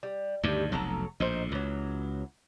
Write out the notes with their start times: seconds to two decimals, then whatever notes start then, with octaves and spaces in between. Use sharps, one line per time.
0.03 G3
0.43 D2 G2 D#3 G3 A3 G4
0.72 F1 B1 F#3 A4 A#5
1.20 A#1 A2 D#4 C5
1.52 C#2 E3 F#3